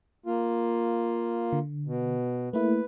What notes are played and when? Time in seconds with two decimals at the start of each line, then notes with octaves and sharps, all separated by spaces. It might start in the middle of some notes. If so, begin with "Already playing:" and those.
0.26 A#3 F4
1.53 D3
1.86 B2
2.53 A3 A#3 E4 B4